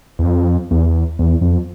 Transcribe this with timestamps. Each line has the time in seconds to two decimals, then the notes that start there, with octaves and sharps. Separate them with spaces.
0.19 E2
0.24 F2
0.71 E2
1.19 E2
1.41 F2